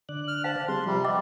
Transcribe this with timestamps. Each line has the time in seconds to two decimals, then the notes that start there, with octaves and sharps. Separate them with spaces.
0.09 D3 D5 F#6
0.28 F6
0.44 C5 F5 A5
0.68 G3 C4 G#4 C6
0.86 C3 F3 G3
1.04 C4 D#5 F#5 D6